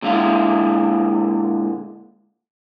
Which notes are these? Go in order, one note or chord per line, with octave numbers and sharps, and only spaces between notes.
A#2 D3 G#3 E4 F5